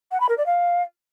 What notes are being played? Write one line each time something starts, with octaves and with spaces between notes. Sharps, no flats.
F#5
B5
A#4
D5
F5